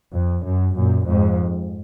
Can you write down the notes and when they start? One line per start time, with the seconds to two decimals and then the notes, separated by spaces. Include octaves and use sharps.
0.13 F2
0.44 F#2
0.75 F#2 A#2
1.08 F2 G#2